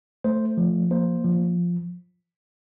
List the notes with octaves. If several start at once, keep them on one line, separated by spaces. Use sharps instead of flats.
A3 C5
F3
A#3 C5
F3